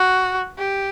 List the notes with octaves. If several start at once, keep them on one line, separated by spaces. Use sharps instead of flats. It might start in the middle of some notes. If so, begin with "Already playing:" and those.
Already playing: F#4
G4